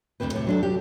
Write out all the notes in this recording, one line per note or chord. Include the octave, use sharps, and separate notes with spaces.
D2 G#2 C3 C4 B4
A2 C3
F#3 D4 A4
G4